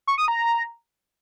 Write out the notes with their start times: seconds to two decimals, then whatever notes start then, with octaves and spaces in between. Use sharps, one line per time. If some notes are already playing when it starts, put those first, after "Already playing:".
0.07 C#6
0.18 D#6
0.28 A#5